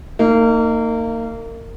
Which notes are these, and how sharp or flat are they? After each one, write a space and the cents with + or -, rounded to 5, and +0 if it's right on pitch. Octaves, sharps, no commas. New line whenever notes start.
A#3 -30 D#4 +0